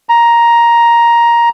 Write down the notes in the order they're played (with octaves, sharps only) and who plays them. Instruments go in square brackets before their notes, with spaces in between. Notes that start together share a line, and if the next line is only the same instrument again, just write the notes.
[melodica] A#5